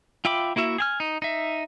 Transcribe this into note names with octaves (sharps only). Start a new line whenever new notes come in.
F4 E5 G5 B5 D6
A#3 E4 F#4 E5
G#4 G#5 F6
D#4
D#4 E5